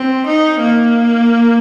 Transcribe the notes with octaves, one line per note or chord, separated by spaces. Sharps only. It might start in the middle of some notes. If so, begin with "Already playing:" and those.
Already playing: C4
D#4
A#3